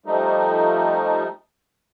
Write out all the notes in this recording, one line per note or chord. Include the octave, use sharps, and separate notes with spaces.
F3 G3 A3 D#4